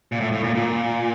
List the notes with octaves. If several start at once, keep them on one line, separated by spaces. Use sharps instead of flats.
A#2
A2
A2
A#2
A#2